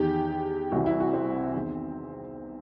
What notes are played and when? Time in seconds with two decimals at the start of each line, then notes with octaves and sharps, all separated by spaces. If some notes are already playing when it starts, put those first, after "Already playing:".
Already playing: E2 D#3 G4
0.72 C2 C3 E3 F#4
0.86 E4
1.00 F#4
1.13 C4
1.54 E2 D#3